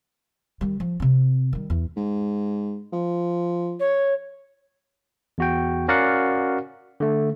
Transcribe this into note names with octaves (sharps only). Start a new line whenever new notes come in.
D#3 G3
F3
C3 C4
D#3 G3
E2
G#2
F3
C#5
E2 F#4 G5
C#4 F#4 A#4 D5 F5 F#5
D3 A3